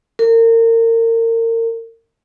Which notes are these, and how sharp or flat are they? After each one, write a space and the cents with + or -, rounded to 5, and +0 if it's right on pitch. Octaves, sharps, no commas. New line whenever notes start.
A#4 -35